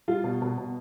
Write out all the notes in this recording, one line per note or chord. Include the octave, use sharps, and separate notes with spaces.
G3 F4
B2
B2
B2